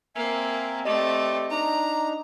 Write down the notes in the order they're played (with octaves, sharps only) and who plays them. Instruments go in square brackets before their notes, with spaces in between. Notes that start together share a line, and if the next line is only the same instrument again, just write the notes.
[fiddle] A#3 C4 [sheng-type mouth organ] E5 G#5
[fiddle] A3 C4 [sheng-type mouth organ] G4 D5 [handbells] D#5
[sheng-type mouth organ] D4 D#4 [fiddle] A#5